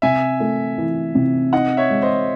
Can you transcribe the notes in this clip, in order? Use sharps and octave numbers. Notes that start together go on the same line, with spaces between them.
C3 E5 G#5
A3
E3
C3
D#4 D#5 F#5
C#5 E5
G#3
C5 D#5